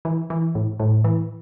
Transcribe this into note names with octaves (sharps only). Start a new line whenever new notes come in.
E3
E3
A2
A2
E3